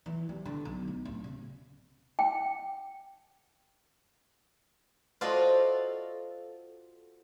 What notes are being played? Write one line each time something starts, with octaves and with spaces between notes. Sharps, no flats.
E3
G3
D3
B1
G#3
D1
C#3
G5
F4 F#4 A4 C5 D5 D#5